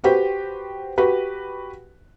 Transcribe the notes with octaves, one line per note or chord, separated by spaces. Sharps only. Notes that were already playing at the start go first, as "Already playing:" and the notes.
F#4 G4 B4 C5 G5
F#4 G4 B4